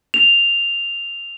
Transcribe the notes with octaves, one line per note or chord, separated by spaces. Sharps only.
F7